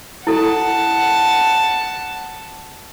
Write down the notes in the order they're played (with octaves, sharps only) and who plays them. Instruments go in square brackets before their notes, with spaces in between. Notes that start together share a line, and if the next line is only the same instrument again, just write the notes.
[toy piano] E4 A4 [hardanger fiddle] F#5 A5